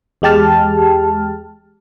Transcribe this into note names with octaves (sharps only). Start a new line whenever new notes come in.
E2 G#3 G4 A5 F6